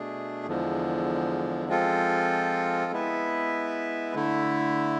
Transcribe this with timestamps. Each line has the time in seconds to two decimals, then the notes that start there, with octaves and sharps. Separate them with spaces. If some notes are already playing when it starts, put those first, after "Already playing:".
Already playing: B2 A3 D4 G#4
0.46 E2 D3 F3 G#3
1.68 F3 G#3 C4 F4 A4
2.92 G#3 B3 E4 B4 E5
4.15 D3 A3 E4